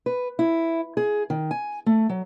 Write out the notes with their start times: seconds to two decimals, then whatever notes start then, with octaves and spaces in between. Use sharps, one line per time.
0.06 B4
0.39 E4
0.97 G#4
1.30 D#3
1.51 G#5
1.86 A3
2.09 F#3